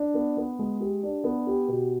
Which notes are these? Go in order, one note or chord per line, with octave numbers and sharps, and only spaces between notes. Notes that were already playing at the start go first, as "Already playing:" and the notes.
Already playing: D4
B3
B3
G#3
G4
D4
B3
G4
B2